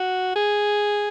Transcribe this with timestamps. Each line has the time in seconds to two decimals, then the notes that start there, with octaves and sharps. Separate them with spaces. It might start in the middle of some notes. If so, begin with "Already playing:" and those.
Already playing: F#4
0.36 G#4